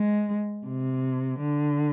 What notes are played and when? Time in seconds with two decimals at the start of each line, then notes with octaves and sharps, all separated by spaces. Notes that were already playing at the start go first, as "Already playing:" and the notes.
Already playing: G#3
0.67 C3
1.40 D3